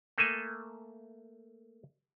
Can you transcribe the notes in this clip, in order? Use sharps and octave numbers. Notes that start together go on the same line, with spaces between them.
A3 A#3 A4 G#5